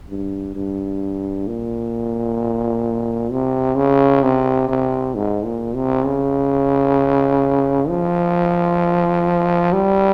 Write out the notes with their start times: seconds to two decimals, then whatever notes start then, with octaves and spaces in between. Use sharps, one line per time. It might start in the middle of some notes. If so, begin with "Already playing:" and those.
0.10 G2
0.56 G2
1.48 A#2
3.32 C3
3.77 C#3
4.23 C3
4.69 C3
5.15 G#2
5.45 A#2
5.76 C3
6.06 C#3
7.89 F3
9.73 G3